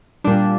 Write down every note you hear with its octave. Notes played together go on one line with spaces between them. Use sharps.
A#2 G3 D4